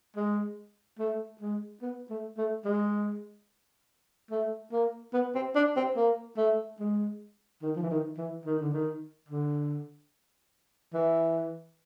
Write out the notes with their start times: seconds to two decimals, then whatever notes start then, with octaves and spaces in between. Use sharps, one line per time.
0.16 G#3
0.99 A3
1.41 G#3
1.82 B3
2.10 A3
2.38 A3
2.65 G#3
4.31 A3
4.72 A#3
5.14 B3
5.35 C4
5.56 D4
5.76 C4
5.97 A#3
6.37 A3
6.80 G#3
7.62 D#3
7.76 F3
7.83 E3
7.90 D#3
8.18 E3
8.46 D#3
8.59 D3
8.73 D#3
9.28 D3
10.94 E3